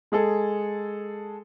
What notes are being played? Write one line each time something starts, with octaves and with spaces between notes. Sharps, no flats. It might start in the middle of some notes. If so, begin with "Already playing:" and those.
G#3 G#4 A4